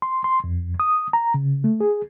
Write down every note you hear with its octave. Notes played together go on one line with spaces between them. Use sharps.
C6
C6
F2
D#6
A#5
C#3
A3
G#4